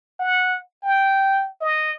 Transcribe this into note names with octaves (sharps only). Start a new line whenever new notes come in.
F#5
G5
D#5